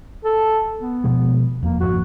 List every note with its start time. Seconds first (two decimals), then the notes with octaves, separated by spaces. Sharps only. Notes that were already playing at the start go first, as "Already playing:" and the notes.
0.24 A4
0.80 B3
1.04 B2 F3 G#3
1.62 E1 F2 A#3
1.80 G#1 F2 F#4